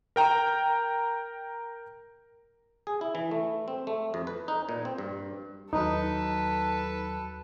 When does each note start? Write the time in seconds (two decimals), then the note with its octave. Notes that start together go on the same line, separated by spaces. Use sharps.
0.16 A#4 G5 A#5
2.87 G#4
3.01 E4
3.15 E3
3.31 A3
3.68 C4
3.87 A3
4.14 F2
4.27 B4
4.48 D#4
4.69 A#2
4.85 C4
4.98 G2
5.73 D#2 F#3 D#4 A4 B4